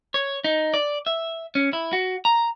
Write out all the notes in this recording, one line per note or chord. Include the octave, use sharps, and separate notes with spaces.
C#5
D#4
D5
E5
C#4
E4
F#4
A#5